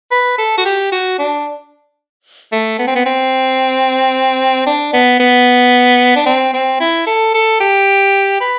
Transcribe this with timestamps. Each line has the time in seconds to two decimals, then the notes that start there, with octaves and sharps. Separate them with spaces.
0.12 B4
0.38 A4
0.58 F#4
0.65 G4
0.92 F#4
1.19 D4
2.52 A3
2.79 B3
2.88 C4
2.96 B3
3.06 C4
4.66 D4
4.93 B3
5.20 B3
6.16 D4
6.26 C4
6.54 C4
6.80 E4
7.07 A4
7.34 A4
7.60 G4
8.41 B4